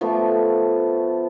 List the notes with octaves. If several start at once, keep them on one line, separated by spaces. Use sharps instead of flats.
F3 A3 B3 D6